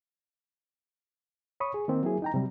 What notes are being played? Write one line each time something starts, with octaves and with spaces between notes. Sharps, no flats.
C#5 B5 C#6 D#6
G#4
D#3 A#3 C4
F#3 A#3 E4 G#4
D#4 G5 A#5
C3 F#3 G3